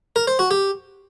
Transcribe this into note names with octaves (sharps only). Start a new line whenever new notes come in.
A#4
C5
F#4
G4